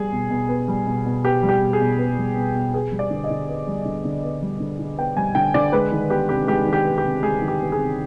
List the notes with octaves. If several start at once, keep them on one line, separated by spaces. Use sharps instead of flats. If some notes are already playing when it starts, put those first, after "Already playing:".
Already playing: G3 B3 G#4
B2
B2
B3
G3
B2
B2
B3 G4
G3
G4
B2
G#4
B2
B3
G3
B2
B2
B3 G#4
G3
D5
D3
D#5
D3
B3
G3
D3
D3
B3
G3
D3
D3
B3 G5
G3 G#5
D3 G5
D3 D5
G#3 B4
D#3
B3 G4
C3 G4
G#3 G4
D#3
G4
B3
G4
C3
G#3 G#4
D#3
G4
B3
G#4
C3